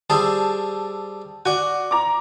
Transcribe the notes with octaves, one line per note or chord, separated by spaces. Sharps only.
G3 G#4 C5 A5 E6
F#4 D5 G#5
A#5 D6